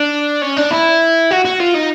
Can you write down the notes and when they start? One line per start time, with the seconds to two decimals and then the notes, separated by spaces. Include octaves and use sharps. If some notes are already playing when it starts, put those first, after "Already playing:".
Already playing: D4
0.42 C#4
0.57 D4
0.71 E4
1.31 F#4
1.45 F#4
1.59 F4
1.74 D#4